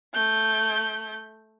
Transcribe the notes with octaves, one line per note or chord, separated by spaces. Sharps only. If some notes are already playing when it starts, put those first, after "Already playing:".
A3 G6